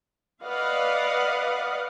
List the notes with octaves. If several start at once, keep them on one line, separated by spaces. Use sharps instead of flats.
B4 D5 D#5 F5 F#5